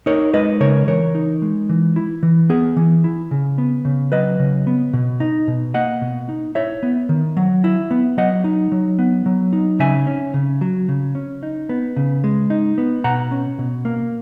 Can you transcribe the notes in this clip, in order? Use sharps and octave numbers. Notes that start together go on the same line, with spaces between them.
D#4 A#4 C#5
G#3 B4 D#5
C#3 A#4 C#5
E3 A#4 C#5
D#4
G#3
E3
E4
E3
B3 G#4
E3
E4
C#3
B3
C#3
F#3 B4 D#5
C#3
B3
B2
D#4
B2
A#3 D#5 F#5
B2
D#4
E4 C#5 E5
B3
D#3
F#3
E4
B3
F#3 D#5 F#5
D#4
F#3
B3
F#3
D#4
C#3 E5 G#5
C#4
C#3
F#3
C#3
C#4
D#4
B3
C#3
G#3
D#4
B3
B2 F#5 A#5
C#4
B2
A#3